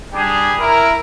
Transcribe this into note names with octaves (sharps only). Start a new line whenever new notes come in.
G3 D4 G4 G#4
E4 A#4